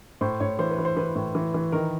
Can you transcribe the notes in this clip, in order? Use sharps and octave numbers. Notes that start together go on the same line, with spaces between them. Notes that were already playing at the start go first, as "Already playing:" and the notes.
A2 C5
A2 C#5
E3 C5
B4
E3
C5
E3 B4
A2
E3
E3
D#3 A#4